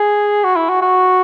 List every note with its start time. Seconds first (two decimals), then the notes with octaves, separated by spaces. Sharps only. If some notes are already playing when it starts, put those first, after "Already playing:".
Already playing: G#4
0.44 F#4
0.56 E4
0.69 F#4
0.82 F#4